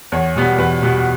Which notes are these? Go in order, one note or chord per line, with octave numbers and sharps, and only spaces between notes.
E2 C#5
B2 G3 B3
E2 B4
B2 G3 B3